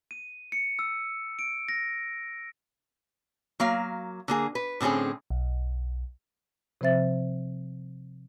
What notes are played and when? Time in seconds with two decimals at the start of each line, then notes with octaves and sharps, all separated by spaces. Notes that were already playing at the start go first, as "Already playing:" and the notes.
0.11 D#7
0.52 C#7
0.79 E6
1.39 D7
1.69 A#6
3.60 F#3 A#3 F5
4.28 D3 A#3 G#4
4.55 B4
4.81 A2 D3 C4 C#4 G#4
5.30 B1
6.81 C3 F3 C4 C5 E5 A6